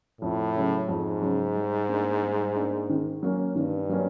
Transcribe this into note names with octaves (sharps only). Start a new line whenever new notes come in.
F2 A2
C#3 F#3
F2 G#2
C#3 F#3
G3
A#3 D4
G3
A#3 D4
D#3
F#3 A#3 C#4
G2 D#3
F#3 A#3 C#4